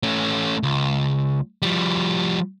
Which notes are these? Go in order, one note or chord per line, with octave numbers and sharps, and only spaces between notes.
A3 C#4
C#2
F3 G3